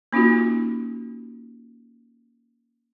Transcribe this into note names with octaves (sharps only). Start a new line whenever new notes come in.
A#3 C#4 D#4 F4 F#4